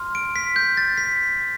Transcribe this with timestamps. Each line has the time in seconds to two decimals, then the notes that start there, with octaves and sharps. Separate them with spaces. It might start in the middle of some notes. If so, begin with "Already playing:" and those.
Already playing: C6 F6
0.15 D7
0.36 B6
0.56 G6
0.77 A6
0.98 B6